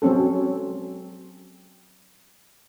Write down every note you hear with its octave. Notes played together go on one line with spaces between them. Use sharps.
F#3 G#3 C4 C#4 A4